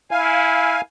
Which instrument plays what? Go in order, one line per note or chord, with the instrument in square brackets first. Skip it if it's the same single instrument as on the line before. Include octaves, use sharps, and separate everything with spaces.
[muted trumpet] E4 [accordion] F5 G#5